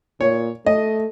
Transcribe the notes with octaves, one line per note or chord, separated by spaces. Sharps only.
A#2 C#5
A3 D#5